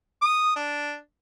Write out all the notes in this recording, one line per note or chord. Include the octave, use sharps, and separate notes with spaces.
D#6
D4